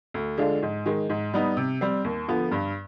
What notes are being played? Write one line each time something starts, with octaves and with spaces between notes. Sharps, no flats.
D2
D3 G#3 D4 F4
G#2
D#3 G#3
G#2
G3 B3 D#4
C3
G3 C4
D#2
D3 F3 B3
G2